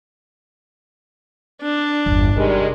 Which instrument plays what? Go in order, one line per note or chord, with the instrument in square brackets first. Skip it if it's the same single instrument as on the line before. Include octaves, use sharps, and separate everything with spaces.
[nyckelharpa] D4
[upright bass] G1 E2
[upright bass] C3 [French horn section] D#3 G3 G#3